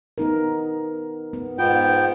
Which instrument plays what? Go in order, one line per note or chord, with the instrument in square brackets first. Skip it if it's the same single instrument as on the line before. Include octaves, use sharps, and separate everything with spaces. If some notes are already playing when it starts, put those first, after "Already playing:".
[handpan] B3 D#4 A#4
B3
[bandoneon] G#2 B3 G5 [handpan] F4